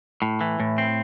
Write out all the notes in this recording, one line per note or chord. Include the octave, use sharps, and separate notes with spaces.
A2
E3
A2
C4